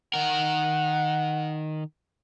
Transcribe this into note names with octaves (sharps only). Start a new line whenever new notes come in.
D#3 A#4 F#5